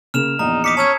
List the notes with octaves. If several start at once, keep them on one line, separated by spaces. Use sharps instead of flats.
C#3 A#3 F6 E7 F7
A#1 E2 D#4 A#5
D#4 D6 D#6 B6 C#7
C#4 C#5 A5 E6 G#6